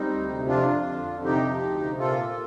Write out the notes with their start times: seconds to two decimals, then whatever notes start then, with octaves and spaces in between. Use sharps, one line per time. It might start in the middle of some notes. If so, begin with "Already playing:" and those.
Already playing: G3 C4 D#4
0.11 D2
0.30 C3
0.48 F2 D4 F4
0.68 F2
0.86 D3
1.05 F2
1.24 C3 D#4 G4
1.43 F3
1.62 D2
1.81 C3
1.99 A#2 F4 A4
2.19 A#3